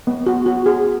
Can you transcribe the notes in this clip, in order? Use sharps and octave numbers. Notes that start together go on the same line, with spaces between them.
B3
F#4
F#4
G#4